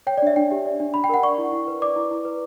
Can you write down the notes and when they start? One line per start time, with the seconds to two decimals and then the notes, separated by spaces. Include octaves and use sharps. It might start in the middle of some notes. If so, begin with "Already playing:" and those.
0.07 C#5 G5
0.17 D5
0.22 D4 E5
0.36 D4 G5
0.51 G4
0.66 D5
0.80 D4
0.94 D4 B5
1.04 G5
1.09 A#4 F#5
1.23 D5 C#6
1.38 E4
1.52 E4
1.68 B4
1.82 D5 D6
1.96 E4
2.11 E4
2.25 B4